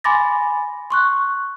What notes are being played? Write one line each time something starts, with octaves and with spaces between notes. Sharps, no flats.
G#5 B5 C6 D6 A6 A#6
C6 C#6 F#6